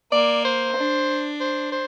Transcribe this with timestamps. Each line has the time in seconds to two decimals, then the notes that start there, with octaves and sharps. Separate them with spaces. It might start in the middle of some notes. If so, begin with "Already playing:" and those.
0.12 A#3 D5
0.45 C5
0.77 D4
1.40 C5
1.72 C5